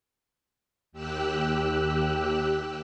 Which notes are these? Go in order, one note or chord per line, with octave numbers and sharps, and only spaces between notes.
D#2 G4 E6 F#6